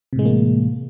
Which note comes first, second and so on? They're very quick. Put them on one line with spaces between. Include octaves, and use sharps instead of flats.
C3 A2 G#3 E3 A#3